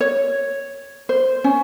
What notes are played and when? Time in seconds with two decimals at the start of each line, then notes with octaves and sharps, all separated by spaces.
0.01 C#5
1.09 C5
1.44 C#4